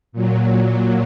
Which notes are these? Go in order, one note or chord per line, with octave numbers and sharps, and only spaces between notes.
A#2 F#3